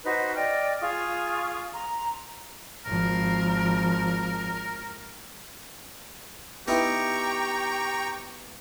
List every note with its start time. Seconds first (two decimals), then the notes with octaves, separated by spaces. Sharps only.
0.04 D#4 F#4 B4 C5
0.34 D5 D#5 G5 F6
0.81 F4 G#4 C#6 D#6
1.73 A#5 C6
2.85 G#1 F3 A#4
6.68 B3 D#4 E4 G4 G5 A#5 C#6